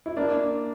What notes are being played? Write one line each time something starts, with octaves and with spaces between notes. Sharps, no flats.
E4
A#3 D4